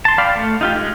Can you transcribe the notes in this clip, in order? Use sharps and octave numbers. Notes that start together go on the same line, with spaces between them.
A5 C6
D5 F5 G5 B5
A3
D#4 F4 G4
G#3